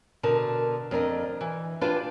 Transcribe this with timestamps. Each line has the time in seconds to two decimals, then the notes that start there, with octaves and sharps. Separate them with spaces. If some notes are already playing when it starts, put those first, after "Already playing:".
0.23 B2 D3 A#4 A5
0.91 F2 D4 A#4 D#5
1.41 E3
1.81 D4 F4 G4 B4 F5 A5